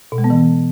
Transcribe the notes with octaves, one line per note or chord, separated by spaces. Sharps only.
B2
G#3
B3
E3